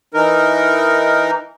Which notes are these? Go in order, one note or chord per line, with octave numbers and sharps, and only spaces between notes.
E3 D#4 A#4